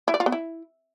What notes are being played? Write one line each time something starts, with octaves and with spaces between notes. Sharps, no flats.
E4
D5
F4
B3
E4